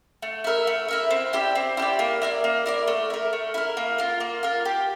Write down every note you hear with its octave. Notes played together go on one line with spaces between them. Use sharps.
A3
E4 A#4 E5
A3
E4 A#4 E5
C4
E4 G4 D5
C4
E4 G4 D5
A#3
E4 A#4 D5
A#3
E4 A#4 D5
A3
E4 A#4
A3
E4 A#4
A#3
F4 A#4
A#3
F4 A#4
G4